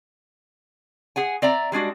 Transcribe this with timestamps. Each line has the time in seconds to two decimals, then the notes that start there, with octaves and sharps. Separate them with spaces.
1.16 G#4 F#5 G#5
1.42 C4 D5 E5 A#5
1.72 G3 G#3 D4 F#4